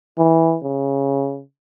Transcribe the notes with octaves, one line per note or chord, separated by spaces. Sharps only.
E3
C#3